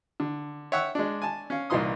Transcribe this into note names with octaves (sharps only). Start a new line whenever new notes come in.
D3
C#5 E5 F#5 G5 E6
G#3 D4
G#5 A5
C#4 F5
C2 A#2 E3 D#4 C6 D#6